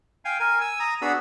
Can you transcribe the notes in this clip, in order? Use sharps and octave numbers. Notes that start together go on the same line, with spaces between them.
F5 G5 G#5
A#4 G#5
G#5 E6
A#5 D#6
B3 D4 F#4 G#4 B5 E6